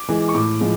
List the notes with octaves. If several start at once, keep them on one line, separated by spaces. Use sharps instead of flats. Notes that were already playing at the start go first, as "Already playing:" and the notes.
Already playing: D6
E3 G#3
C#6
A2 D6
F3 G#3